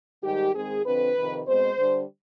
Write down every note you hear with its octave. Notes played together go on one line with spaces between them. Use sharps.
G#2 D#3 G3 G4
G#2 D#3 G#3 C4 G#4
F2 D3 F3 C4 B4
F2 C3 D#3
B2 G#3 C4 C5
D3 G3 D4